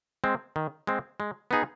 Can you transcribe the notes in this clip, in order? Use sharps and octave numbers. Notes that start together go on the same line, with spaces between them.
G#3 C4
D#3
G#3 C4
G#3
B3 D#4 G#4